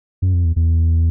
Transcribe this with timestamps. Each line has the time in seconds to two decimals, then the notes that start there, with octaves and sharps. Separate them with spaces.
0.22 F#2
0.34 F2
0.45 E2
0.56 E2